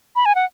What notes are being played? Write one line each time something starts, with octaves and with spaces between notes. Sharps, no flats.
B5
G#5
F#5